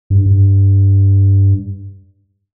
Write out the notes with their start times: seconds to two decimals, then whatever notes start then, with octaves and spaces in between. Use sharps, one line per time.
0.10 G2
0.26 G2